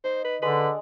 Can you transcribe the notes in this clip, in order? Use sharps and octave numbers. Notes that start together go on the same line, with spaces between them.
D#4 C5
B4
D3 G#3 D4 B4